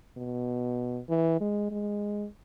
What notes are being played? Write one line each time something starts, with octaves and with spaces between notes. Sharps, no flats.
B2
E3
G#3
G#3